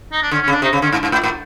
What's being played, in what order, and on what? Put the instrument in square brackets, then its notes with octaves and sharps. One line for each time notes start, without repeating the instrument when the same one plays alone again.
[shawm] D#4
D4
[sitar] D3 [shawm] C#4
[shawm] C#4
[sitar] C#3
[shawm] D4
[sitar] C3 [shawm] D#4
[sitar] C#3
[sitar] D3 [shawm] C#4
[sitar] G#2
G#2
A2
A2